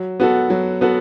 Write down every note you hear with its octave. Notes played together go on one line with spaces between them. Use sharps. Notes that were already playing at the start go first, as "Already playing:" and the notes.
Already playing: F#3
B3 F#4 A4
F#3
B3 F#4 A4